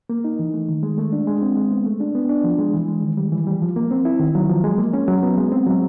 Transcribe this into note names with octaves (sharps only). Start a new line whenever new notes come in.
A#3
D#4
E3
A3
D#3
G#3
A3
D4
G#3
C4
G#3
B3
A3
D4
B3
D4
F3
G#3
E3
G#3
D#3
G3
E3
G3
F3
A#3
C4
E4
D#3
F#3
F3
G#3
A#3
C#4
F#3
B3
G#3
C4
F#3